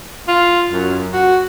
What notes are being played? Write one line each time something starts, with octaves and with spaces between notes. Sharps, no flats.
F4
F#2
F#4